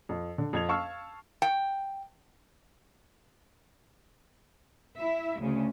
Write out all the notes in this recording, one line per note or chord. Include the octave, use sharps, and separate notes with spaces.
F2
D3
F2 G#6 F7
F5 A5 C#6 E6 F6
G5
E4 E5
D2 C#3